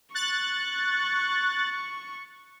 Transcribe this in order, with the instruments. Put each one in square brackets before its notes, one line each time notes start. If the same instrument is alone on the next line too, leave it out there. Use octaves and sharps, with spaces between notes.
[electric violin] C#6 [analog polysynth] F#6 A6